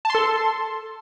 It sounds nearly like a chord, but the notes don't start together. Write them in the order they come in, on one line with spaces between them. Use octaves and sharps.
A5 C6 A4